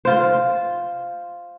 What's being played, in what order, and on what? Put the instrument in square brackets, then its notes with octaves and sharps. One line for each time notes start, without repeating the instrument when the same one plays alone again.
[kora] F4 C5